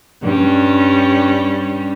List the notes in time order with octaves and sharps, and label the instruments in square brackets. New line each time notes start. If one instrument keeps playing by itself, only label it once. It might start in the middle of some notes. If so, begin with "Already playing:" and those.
[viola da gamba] G2 G3 C#4